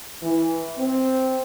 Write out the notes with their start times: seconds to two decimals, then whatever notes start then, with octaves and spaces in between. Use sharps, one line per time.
0.22 E3
0.78 C4